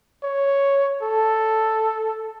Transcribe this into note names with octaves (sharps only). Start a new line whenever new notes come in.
C#5
A4